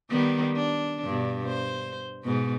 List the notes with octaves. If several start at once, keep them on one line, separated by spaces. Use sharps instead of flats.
D#3 G3 B3
D4
G2 B2
C5
G#2 B2